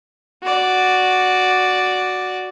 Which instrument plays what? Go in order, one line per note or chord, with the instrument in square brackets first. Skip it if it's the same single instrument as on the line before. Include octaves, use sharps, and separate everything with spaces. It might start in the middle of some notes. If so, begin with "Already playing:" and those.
[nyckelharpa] F#4 D5